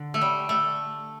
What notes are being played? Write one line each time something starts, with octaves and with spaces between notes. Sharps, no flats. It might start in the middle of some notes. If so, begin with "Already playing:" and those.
Already playing: D3
A3
G3
A3